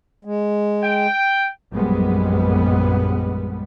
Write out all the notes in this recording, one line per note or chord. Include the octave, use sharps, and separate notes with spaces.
G#3
G5
A#1 F#2 G3 G#3 B3